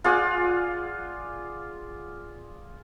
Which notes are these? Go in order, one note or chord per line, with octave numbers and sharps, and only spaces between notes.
F4 G#4 D5 F#5